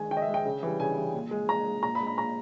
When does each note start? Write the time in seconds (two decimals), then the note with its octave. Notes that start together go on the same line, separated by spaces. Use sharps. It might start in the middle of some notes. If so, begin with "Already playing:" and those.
Already playing: D#3 G#3 G#5
0.11 D#3 G5
0.17 D#5
0.22 E5
0.28 G#3
0.34 G5
0.45 C#3
0.63 E3 G3
0.80 C#3 G#5
0.98 E3 G3
1.14 A#2
1.31 G#3
1.49 A#2 A#5
1.66 G#3
1.83 A#2 A#5
1.95 B5
2.00 G#3
2.07 B5
2.18 A#2 A#5